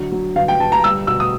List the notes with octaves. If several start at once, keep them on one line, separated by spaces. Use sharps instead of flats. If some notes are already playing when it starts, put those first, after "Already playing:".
Already playing: D3 F#3
F#3
G1 F5
G5
G1 A5
A#5
G3 E6
B2 E6
D#6